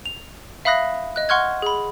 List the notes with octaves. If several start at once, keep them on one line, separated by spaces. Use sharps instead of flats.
F7
E5 F5 B5 D#6 F#6 A#6
D#5 F#6
F#5 C6 C#6 F6 F#6 G#6
G#4 B5